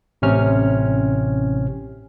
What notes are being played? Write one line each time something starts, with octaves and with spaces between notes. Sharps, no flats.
A1 C3 C#4 F6